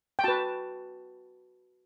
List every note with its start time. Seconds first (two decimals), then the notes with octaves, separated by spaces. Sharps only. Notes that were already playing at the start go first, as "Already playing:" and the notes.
0.19 G5
0.24 F#4 B4 A5